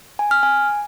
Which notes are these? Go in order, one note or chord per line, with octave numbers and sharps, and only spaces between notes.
G#5
F6
G#5